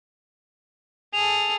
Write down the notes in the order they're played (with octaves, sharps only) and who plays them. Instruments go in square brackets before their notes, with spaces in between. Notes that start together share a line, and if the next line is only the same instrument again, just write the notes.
[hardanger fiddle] G#4 A4 [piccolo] F7